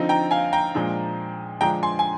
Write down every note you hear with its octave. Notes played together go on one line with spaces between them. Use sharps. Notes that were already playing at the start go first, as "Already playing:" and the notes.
Already playing: D3 F3 C4 D#4
G5 A#5
F5 G#5
G5 A#5
A#2 F3 G#3 D4
D3 F3 G#3 D4 G5 A#5
G#5 C6
G#5